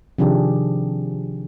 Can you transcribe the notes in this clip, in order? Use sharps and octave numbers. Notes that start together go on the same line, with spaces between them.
C3 D#3 F3 D4 G4 G#4